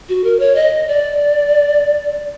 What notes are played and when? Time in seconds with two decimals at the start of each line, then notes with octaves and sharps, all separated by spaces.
0.09 F#4
0.24 A#4
0.40 C#5
0.55 D#5
0.87 D5